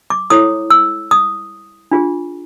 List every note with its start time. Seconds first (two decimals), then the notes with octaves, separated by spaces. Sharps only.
0.10 D6
0.30 E4 A4 C#5 D#6
0.70 E6
1.11 D#6
1.91 D4 F4 G#4